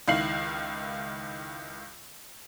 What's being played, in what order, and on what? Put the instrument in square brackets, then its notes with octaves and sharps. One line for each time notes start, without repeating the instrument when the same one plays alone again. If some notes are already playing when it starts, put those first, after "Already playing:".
[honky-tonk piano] C#2 D#3 E4 F5 C7 F#7